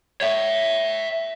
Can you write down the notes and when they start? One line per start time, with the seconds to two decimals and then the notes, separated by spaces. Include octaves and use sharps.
0.21 C#5 E5